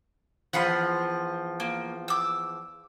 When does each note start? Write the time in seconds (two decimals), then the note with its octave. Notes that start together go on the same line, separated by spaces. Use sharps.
0.53 E2 F3 F#5 B5 C6
1.60 A#3
2.08 D6 E6